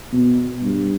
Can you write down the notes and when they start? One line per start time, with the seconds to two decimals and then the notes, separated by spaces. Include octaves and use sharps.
0.12 B2
0.62 G2